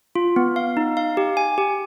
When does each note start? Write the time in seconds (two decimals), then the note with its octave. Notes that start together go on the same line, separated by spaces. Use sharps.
0.15 F4
0.36 B3
0.56 F5
0.77 D#4
0.97 F5
1.17 G4
1.37 G#5
1.58 G4